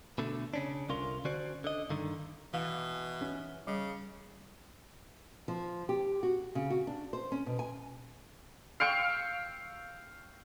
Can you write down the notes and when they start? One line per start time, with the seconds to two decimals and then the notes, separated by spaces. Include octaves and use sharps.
0.18 B2 D3 A3
0.54 C#3 C#4 D4
0.89 C2 D3 C#4 F4 A#4 C6
1.25 D3 C#4 F#4 C5 D5
1.64 D3 D#5
1.90 G2 D3 D#3
2.53 B2 E3 F5
3.21 C#4
3.67 C#3 G3
5.48 F3
5.89 G4
6.23 F#4
6.55 C#3
6.70 F#4
6.87 D4
7.13 C5
7.32 C#4
7.46 B2
7.59 G#5
8.80 F5 G5 C#6 E6